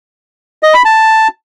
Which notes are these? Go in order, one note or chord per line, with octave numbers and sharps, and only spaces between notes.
D#5
B5
A5